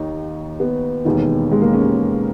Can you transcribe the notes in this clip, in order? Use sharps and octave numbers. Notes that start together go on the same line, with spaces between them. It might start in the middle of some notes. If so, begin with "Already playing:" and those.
Already playing: D#2 D#3 D#4
B3
E1 D#2 D#3
G#3
A#3
C#4